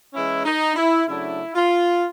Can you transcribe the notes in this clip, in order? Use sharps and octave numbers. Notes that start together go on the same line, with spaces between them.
E3 G#3 C#4 E4
D#4
E4
C#3 F#3 A3 D4 E4
F4